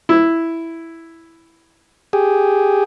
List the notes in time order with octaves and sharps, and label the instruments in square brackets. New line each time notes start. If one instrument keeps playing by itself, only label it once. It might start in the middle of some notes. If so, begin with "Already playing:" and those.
[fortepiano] E4
[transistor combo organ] G4 G#4